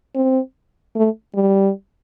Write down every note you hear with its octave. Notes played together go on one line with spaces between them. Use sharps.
C4
A3
G3